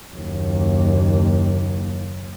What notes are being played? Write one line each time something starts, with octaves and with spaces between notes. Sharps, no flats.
F#1 D#2